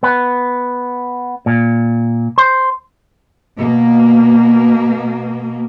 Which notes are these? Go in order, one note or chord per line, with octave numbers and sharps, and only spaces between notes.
B3
A#2
C5
B2 A#3